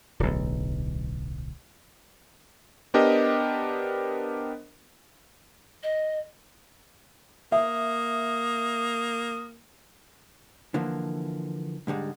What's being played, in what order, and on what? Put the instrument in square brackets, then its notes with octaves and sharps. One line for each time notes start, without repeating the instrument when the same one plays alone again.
[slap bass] D1 B1
[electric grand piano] B3 D4 G4 A#4 C5 D#5
[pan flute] D#5
[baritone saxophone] A#3 [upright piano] E5 [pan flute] D#6
[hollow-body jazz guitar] D3 E3 F3 A#3
G#2 D3 G3 G#3